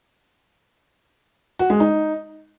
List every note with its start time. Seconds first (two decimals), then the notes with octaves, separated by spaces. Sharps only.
1.59 F#4
1.70 G#3
1.80 D#4